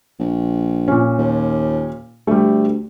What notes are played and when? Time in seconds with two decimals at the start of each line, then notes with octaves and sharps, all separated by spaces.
0.19 A#1
0.88 A#2 C#4
1.19 D#2
2.27 D2 G3 A3